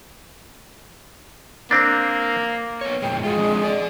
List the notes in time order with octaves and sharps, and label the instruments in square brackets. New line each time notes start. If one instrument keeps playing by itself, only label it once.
[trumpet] A#3 [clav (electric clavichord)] C4 D4
[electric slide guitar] B3 C#5
[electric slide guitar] F2 A#2 G#3 [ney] G5
[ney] G#3 [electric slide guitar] F4 F#4
[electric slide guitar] F3 C4 D4
A4 D5